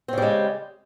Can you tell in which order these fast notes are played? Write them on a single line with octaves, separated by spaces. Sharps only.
C4 C#3 G3 G#3